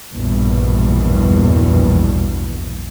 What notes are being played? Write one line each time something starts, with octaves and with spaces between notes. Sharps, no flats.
A#1 E2 G2 B2